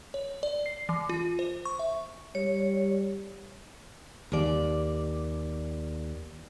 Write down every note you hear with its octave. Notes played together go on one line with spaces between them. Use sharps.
C#5
D5
C7
E3
F4
C5
C#6
E5
G3 C#5
D#2 D5